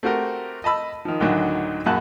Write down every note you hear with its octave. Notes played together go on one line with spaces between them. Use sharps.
A3 C4 F#4 G4 A#4
D#5 A5 B5 E6
D#3 F3
D2 A2 D3 D#3 F#3
A#1 F#2 F#4 A5 F#6